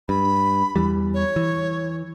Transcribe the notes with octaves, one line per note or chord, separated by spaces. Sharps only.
G2 B5
E2 E3 G3
C#5
E3